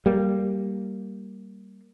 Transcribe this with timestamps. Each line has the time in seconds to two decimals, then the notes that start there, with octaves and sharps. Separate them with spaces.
0.06 G3 A#3